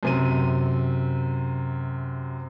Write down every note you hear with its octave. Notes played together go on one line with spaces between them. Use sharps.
F#2 C3 D#7